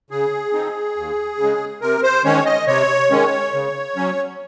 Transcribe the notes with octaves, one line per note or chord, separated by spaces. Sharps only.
C#3 G#4
F3 C4 D#4
D#2
C#3
G#3
C3 A#4
C5
D#3 G#3 C#4 C#5
D#5
C3 C#5
D#3 G#3 C#4
C#3
F#3 C#4